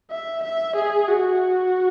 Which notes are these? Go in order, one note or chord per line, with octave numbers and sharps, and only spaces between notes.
E5
E5
G#4
F#4